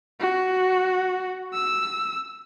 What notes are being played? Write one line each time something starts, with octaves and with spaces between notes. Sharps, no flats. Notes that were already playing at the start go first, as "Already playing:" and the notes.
F#4
E6